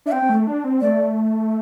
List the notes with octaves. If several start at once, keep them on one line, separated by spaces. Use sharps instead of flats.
D4 E5
C4 G5
C4
A3
D4
C4
A3 D5